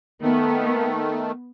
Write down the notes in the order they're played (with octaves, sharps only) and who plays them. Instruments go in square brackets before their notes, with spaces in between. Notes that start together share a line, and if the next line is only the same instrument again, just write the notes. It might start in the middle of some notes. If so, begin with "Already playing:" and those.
[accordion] D#3 A3 [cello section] B3